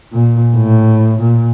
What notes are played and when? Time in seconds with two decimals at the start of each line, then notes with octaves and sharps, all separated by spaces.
0.13 A#2
0.56 A2
1.22 A#2